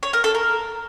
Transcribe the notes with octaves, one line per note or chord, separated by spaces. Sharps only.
C#5
A#4
A4
A#4